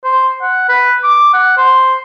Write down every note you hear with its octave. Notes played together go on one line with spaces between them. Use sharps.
C5
F#5
B4
D6
F#5
C5